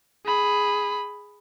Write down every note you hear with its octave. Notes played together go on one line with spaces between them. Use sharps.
G#4 B5